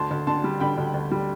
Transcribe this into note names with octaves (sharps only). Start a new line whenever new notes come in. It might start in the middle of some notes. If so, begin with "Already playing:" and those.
Already playing: D2 A5 C6
D2
D3 A5 C6
G3
D3 G5 B5
D2
D2
G3